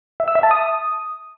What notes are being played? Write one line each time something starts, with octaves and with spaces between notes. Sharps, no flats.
E5
E6
E5
A5
D#6